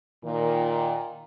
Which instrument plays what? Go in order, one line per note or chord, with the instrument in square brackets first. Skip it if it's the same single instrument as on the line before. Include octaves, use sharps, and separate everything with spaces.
[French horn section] A#2 D#3